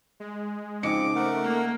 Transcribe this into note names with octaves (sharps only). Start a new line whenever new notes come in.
G#3
C#3 F3 C4 D#4 D6 C#7
A3 A#4 F#5
A#3